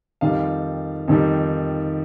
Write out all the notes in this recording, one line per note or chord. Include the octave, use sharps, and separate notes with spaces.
F2 D#3 G3 F5
F2 D#3 G3